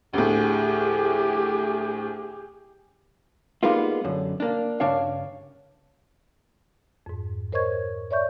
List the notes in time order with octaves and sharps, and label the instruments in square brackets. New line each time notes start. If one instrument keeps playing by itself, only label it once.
[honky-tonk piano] D2 A2 [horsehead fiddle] G4 G#4
[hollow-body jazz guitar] G3 G#3 A#3 B3 D#4 F4
F#2 D3
A#3 D4
G2 C#3 D4 C#5 F5
[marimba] F2 G#2
A#4 C5 C#5 D#5 C#6 G#6
C#5 D5 E5 C#6 G6